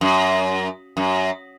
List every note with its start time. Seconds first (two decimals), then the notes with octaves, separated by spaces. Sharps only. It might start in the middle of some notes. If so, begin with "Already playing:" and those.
0.01 F#2
0.97 F#2